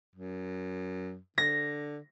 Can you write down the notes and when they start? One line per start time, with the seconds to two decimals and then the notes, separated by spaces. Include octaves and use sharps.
0.15 F#2
1.38 D3 A#6